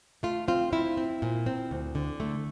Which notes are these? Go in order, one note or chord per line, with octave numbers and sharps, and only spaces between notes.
A3 F4
C4 F4
C4 E4
C4
A#2
C4
D2
D3
A3